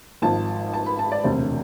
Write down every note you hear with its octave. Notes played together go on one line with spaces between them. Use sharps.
G#1 G#2 F3 A5
A5
B5
A5
D5
E1 D2 C3 C5